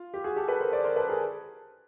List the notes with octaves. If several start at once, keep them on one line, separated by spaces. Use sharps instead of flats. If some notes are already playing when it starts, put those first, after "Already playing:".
Already playing: F4
G4
F#4 G#4
G4 A4
A4 B4
A#4 C5
C5 D5
A#4 C5
A4 B4
G#4 A#4